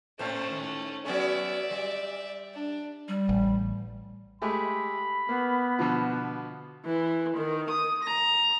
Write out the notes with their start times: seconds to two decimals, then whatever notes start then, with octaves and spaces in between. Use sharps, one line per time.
0.19 A2 A3 C#4 C5
0.50 G#2 D#3
1.06 F#3 B3 C#4 D5 E5
1.71 G3
2.54 D4
3.08 G3
3.29 A1
4.42 G#3 A3 G4 B5
5.29 A#3 B3
5.79 B2 D3 F3
6.85 E3
7.36 D#3
7.70 D#6
8.03 A#5